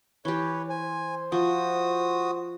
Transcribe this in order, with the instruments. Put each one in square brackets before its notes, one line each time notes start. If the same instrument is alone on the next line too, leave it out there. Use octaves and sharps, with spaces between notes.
[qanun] E3 G4 [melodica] B4 C#5
[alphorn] C5 [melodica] G#5
[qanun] F3 [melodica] F#4 D#6